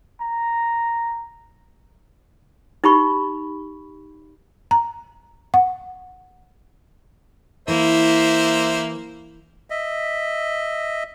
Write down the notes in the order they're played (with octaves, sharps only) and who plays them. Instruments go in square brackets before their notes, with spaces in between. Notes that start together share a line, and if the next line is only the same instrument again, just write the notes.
[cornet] A#5
[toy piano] D#4 G4 B5 C#6
[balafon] A#5
F#5
[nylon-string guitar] E3 [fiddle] A#3 [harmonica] C5 E5
[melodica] D#5 E5